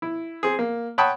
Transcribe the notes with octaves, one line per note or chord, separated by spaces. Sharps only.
E4
C4 G#4
A#3
C#5 F#5 G5 A5 B5 D#6